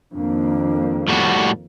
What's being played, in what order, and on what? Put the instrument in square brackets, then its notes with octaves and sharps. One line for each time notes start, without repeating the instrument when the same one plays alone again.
[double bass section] F2 D#3 A#3 [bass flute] D4
[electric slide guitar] A2 G3 F#4